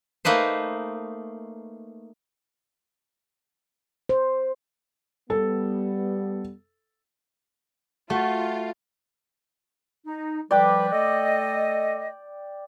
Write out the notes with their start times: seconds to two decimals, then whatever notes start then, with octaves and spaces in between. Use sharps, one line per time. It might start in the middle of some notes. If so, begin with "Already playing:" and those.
0.25 A3 A#3 D#4 B4 C5
4.09 C5
5.30 G3 B3 A4
8.10 A3 F4 F#4
10.06 D#4
10.51 F3 G3 B4 D5 G5 D6
10.91 A3 A4 D#5